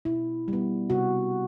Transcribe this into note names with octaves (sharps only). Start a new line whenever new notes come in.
B2 E4
G3 B3
C3 F#4